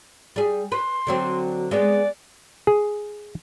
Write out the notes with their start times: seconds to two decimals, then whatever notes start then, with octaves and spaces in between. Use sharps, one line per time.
0.36 G3 G#4
0.72 B4 C6
1.07 D3 F#3 C4
1.71 G#3 B3 D5
2.67 G#4